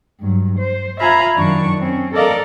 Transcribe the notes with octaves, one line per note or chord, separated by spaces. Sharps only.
G2 F#3
C5
F4 E5 F5 G#5 A#5 B5
F#2 D#3 D4 C#6
C4 C#4
A4 A#4 D5 D#5 F5